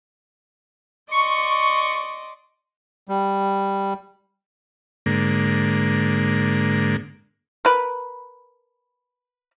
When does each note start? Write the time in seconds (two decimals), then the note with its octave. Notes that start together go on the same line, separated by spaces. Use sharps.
1.11 D5 D#5 C6 C#6
3.09 G3
5.06 G#2 D3 A#3
7.65 A#4 B4